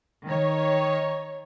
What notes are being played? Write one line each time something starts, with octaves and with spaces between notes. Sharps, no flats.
D#3 C#5